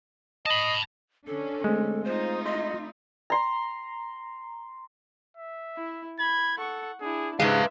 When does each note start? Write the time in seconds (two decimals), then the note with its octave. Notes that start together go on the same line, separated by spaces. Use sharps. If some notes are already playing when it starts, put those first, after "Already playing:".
0.46 D#5 A5 B5
1.27 D3 C#4 D4 A4
1.64 G#3 A3 C4
2.04 D#4 F4 C5
2.45 D#5 E5 C6 G6
3.30 A#5 C6
5.37 E5
5.76 E4
6.19 B5 G#6
6.58 A4 F#5 C#6
7.01 D4 E4 G#4
7.40 G#2 C#3 G#3 F4 G4 B4 E5 F5